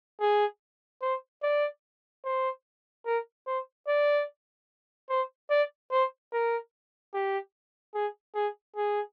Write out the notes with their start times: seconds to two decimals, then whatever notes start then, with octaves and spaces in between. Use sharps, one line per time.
0.21 G#4
1.02 C5
1.43 D5
2.25 C5
3.06 A#4
3.47 C5
3.88 D5
5.09 C5
5.50 D5
5.91 C5
6.32 A#4
7.14 G4
7.95 G#4
8.35 G#4
8.76 G#4